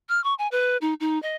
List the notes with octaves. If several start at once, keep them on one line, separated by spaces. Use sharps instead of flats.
F6
C#6
G#5
B4
D#4
D#4
D#5